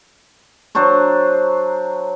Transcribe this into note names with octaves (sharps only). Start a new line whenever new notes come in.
F#3 D4 C5 C#6